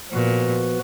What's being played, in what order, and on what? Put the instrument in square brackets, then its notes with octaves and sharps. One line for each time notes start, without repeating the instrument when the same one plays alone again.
[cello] A#2 [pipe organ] F3 B3 F#4 B4